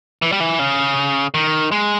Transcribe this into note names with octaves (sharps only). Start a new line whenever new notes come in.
E3
G3
E3
C#3
D#3
G#3